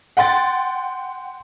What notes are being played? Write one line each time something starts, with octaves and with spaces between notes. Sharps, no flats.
F#5 G5 C6 A6